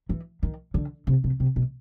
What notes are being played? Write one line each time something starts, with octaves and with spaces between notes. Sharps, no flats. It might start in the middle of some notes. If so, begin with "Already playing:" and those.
E3
D#3
D3
C3
C3
C3
B2